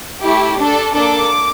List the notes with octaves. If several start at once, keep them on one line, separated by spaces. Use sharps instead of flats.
A3 E4 G4
D4 A4
A#3 D4 A4 D6